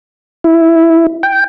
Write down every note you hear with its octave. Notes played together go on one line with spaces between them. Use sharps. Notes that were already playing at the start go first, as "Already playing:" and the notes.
E4
G5